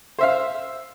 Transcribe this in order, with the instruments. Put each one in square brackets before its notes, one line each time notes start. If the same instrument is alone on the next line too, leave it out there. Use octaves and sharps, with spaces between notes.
[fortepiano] C5 E5 F5